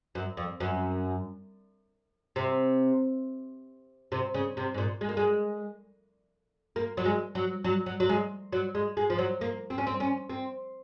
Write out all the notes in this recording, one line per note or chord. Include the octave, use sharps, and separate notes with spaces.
F#2
F2
F#2
C3
C3
C#3
C3
G#2
A#2
G#3
A#3
G#3
A#3
F#3
G#3
F#3
F#3
F#3
F#3
G#3
F#3
G#3
G#3
F3
F#3
A#3
C4
C#4
C4
C#4
C4